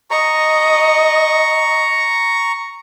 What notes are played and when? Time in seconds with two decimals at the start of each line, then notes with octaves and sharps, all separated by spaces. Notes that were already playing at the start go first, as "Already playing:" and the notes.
0.11 D#5 A#5 C#6